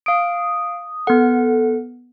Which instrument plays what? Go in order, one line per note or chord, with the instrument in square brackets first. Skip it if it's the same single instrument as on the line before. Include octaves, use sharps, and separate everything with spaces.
[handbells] F5 D7 [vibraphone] D#6
[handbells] B3 F#5 [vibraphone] A4